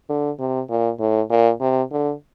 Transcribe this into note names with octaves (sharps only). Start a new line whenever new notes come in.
D3
C3
A#2
A2
A#2
C3
D3